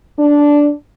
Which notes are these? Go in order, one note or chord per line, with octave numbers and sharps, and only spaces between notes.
D4